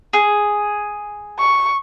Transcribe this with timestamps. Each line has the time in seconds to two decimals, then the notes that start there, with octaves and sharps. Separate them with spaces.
0.13 G#4
1.39 C#6